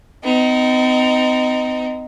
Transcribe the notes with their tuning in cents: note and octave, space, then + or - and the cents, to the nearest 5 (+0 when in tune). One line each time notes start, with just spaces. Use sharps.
C4 -45 D#4 +0